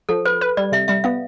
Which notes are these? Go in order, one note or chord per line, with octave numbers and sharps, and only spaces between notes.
F3 A4
B4 C5
B4
G3 D5
C3 E5
G3 E5
B3 F5